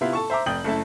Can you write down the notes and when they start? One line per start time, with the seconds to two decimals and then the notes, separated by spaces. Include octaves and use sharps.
0.01 C3 B3 E4 F4
0.13 A4 A5 C#6
0.30 C5 E5 A#5 D6
0.46 F1 G5 D#6 G6 F#7
0.64 F#1 A3 E4 A5